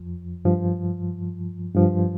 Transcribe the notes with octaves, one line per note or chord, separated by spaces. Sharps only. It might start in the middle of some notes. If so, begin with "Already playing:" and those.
Already playing: F2 F3
G2 F3
G2 F3